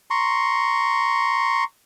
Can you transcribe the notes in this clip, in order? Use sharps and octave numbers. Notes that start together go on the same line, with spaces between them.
A#5 C6 C#6